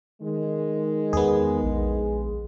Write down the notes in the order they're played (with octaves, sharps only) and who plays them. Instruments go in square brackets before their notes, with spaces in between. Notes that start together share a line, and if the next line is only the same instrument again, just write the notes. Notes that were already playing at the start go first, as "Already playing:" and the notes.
[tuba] D#3 [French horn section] G#3
[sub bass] E2 [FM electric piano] B3 G#4
[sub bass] A#1